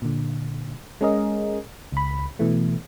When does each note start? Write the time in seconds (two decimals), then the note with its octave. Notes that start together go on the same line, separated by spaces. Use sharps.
0.02 A#2 D3
1.01 G#3 C#4 G#4 A#4 D#5
1.92 C#2 B5
2.39 B2 E3 A3